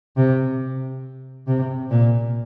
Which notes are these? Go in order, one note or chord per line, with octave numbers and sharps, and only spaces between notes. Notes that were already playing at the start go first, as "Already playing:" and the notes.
C3
C3
A#2